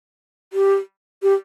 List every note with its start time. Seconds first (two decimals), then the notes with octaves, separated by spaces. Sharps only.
0.53 G4
1.23 G4